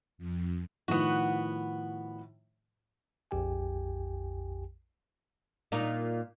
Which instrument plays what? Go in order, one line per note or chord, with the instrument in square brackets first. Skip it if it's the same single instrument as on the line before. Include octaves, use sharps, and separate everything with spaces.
[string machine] F2
[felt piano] A2 D#3 F3 [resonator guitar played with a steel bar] B3 F#4
[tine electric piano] A#1 F2 G4 G5 G#5
[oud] A#2 D#4